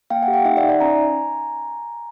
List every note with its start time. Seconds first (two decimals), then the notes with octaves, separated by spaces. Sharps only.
0.10 A#3 F5 G5
0.23 F#5 G#5
0.28 G4
0.34 F5 G5
0.45 D#4 E5 F#5
0.57 D5 E5
0.63 D#4
0.69 D5 E5
0.80 C#4 G#5 A#5